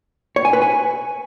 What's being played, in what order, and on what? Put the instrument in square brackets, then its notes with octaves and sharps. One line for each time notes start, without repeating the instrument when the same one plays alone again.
[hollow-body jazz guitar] C#5
G#5
B4
G#5